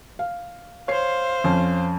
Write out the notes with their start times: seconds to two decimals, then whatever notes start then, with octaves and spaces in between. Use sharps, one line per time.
0.19 F5
0.88 C5 C#5 F5 C7
1.44 F2 C#4